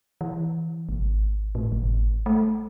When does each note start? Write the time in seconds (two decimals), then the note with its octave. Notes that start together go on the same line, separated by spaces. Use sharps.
0.21 E3
0.89 G#1
1.55 A2
1.72 G#1
2.26 A3